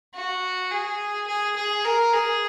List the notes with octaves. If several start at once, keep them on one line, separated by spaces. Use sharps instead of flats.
F#4
G#4
G#4
G#4
A#4
G#4